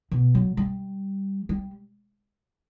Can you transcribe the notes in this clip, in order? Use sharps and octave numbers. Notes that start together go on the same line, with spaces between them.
B2
F#3
G3
G3